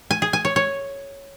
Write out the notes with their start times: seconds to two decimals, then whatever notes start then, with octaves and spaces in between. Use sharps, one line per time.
0.11 G#5
0.22 G#4
0.33 G#5
0.45 C#5
0.56 C#5